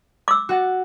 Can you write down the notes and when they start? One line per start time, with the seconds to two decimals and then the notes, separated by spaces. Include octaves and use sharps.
0.28 D6 E6
0.49 F#4 F#5 A6